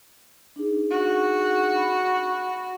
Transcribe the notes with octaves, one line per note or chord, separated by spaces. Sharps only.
D4 D#4 G#4
F#4
B5